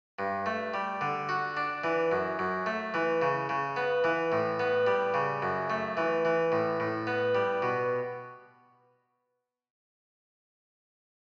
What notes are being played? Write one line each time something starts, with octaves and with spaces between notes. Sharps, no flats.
G2
A3
G3
D3
F#4
D4
E3
F#2
F#2
A3
E3
C#3
C#3
B3
E3
A2
B3
G3
C#3
F#2
A3
E3
E3
A2
A2
B3
G3
B2